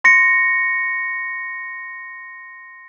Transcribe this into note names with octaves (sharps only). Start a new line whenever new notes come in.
C6 A#6 C#7